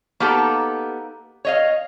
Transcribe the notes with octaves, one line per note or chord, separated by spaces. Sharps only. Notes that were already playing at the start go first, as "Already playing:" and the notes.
A#3 B3 D#4 G4 A4
C#5 D#5 F5